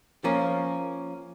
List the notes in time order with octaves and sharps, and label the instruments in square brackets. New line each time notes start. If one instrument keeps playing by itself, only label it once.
[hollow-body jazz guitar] F3 A#3 C#4